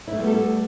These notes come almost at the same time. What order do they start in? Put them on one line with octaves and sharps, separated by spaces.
E4 A3 G3 B3 A4